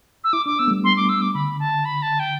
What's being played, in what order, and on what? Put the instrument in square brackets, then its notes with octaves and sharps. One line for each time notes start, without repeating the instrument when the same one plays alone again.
[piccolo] E6
[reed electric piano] E4 [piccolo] D6
[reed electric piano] D4 [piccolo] D6
[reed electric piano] B3 [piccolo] E6
[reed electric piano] A3
G3
[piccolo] C6
D6
E6
D6
[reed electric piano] D3 [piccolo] B5
[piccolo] A5
B5
A5
G5